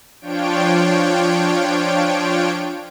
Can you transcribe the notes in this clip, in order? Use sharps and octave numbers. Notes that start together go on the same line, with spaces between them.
F3 D4 F4 C#5 G5 D7